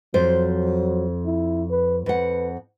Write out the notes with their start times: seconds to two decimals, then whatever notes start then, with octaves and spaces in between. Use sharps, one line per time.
0.14 F2 F#3 C5
1.26 E4
1.70 B4
2.06 F2 B4 F#5